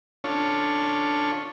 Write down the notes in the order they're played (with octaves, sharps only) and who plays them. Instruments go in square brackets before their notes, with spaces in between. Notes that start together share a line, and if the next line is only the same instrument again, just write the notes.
[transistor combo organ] C#4 D4 F4 A4 C#5